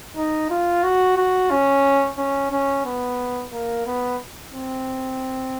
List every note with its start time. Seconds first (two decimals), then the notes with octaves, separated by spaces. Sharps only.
0.16 D#4
0.50 F4
0.84 F#4
1.17 F#4
1.51 C#4
2.18 C#4
2.51 C#4
2.85 B3
3.53 A#3
3.86 B3
4.54 C4